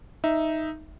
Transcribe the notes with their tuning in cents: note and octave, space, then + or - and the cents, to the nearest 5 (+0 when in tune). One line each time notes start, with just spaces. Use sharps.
D#4 +0 E5 +0